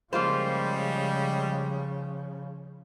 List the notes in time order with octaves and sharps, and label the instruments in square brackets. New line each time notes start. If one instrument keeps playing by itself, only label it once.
[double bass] C#3 F3 [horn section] G3 G#3 [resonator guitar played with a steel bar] A#3 F4 C5